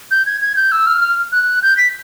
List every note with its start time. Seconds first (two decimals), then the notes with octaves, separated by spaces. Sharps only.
0.11 G6
0.26 G#6
0.41 G#6
0.56 G6
0.72 E6
0.87 F6
1.01 F6
1.32 F#6
1.63 G6
1.77 B6